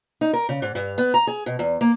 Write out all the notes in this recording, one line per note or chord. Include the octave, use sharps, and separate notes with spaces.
D#4
A#4
C#3
G#2
G2
B3
A#5
G#4
B2
E2
A#3